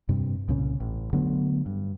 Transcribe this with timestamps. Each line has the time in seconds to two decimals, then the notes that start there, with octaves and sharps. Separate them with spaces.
0.09 G2 C3
0.48 C2 A#2 C#3 C#4
0.80 A1
1.13 D3 F#3 A3 B3
1.66 G2